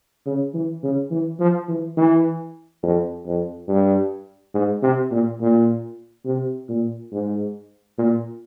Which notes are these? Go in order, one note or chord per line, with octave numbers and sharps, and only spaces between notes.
C#3
E3
C#3
E3
F3
E3
E3
F2
F2
G2
G#2
C3
A#2
A#2
C3
A#2
G#2
A#2